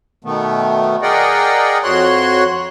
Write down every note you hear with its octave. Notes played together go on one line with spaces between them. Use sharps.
B2 D#3 A3 B3
G#4 A#4 D5 D#5 F#5 G5
F2 F#4 C#5 C6 F#6